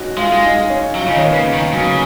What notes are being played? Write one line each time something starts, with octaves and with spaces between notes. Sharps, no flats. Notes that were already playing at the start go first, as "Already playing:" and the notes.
Already playing: C#4 D#4 F#4
G#3 F4
G#3
D#4
C#4
F#3
F4
C#3 D#4
D#3
C#4
B3
C#3 A#3
D#3
C#3 F#3